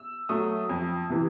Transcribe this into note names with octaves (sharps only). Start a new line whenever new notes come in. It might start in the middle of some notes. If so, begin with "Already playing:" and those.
Already playing: E6
F#3 A3 D#6
F2
C3 E3